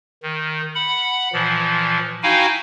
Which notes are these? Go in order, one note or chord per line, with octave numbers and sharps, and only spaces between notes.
D#3
F#5 B5
A#2 E3 F3
D#4 E4 F#4 F5 G5 G#5